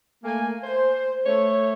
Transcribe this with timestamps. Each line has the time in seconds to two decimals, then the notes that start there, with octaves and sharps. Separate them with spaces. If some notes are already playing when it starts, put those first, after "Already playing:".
0.24 A3 A#3 G#5
0.64 C5
1.26 A3 C#5